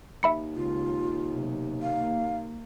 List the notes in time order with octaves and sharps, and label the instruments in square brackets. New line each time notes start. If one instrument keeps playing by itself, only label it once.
[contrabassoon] D#2 [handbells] E5 B5 C#7
[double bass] C#2 [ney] F4
[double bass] B1 C3
[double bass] A#3 [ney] F5